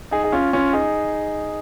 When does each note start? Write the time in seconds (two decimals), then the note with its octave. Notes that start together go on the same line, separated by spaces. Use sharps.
0.11 D#4 G#4
0.24 G#4
0.32 C#4 F4
0.53 C#4 F4
0.73 D#4 G#4